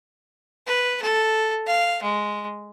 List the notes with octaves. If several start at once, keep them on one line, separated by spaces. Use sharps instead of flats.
B4
A4
F5
G#3